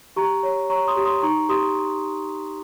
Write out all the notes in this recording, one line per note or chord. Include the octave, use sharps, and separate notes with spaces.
G4 A#5 C#6
C#5
C#5 A#5 C#6
C6 D#6
G4
C6 D#6
D#4 A#5 C#6
G4 C6 D#6